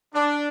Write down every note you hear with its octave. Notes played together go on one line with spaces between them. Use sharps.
D4